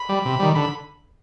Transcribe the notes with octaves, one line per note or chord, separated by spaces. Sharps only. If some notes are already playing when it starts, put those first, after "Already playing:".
Already playing: B5
G3
C3
D#3 G3
D3 B5